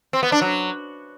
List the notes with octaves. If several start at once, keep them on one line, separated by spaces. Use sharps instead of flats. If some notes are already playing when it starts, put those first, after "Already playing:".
C4
B3
D4
F#3